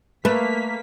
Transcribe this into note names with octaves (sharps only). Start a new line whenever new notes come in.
A3 A#3 B4 B6